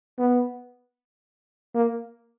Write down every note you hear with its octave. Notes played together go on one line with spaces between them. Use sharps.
B3
A#3